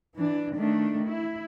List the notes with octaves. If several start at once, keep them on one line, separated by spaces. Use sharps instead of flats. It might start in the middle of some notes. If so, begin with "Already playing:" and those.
E3 D4
D#3 A3 D4
E4